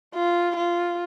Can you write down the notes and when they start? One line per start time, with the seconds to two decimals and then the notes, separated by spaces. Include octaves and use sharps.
0.15 F4
0.56 F4